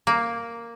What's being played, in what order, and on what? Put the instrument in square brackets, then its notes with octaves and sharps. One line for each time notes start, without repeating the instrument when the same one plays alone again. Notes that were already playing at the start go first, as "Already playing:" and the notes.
[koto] A#3